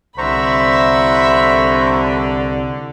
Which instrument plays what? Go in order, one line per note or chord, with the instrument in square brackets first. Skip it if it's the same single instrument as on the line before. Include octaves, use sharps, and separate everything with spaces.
[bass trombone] C2 [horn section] D3 [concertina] C5 A#5 C#6 [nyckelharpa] E5 B5